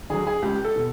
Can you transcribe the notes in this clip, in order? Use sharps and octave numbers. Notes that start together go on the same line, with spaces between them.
D3 F#3 G#4
G#4
C#2 G4
A4
B2